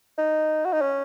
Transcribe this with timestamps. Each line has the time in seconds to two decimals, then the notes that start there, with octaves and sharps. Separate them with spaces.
0.18 D#4
0.65 F#4
0.73 D#4
0.81 C#4